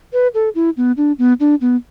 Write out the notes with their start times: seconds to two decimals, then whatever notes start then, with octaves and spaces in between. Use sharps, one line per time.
0.13 B4
0.34 A4
0.55 E4
0.77 B3
0.97 D4
1.18 B3
1.40 D4
1.61 B3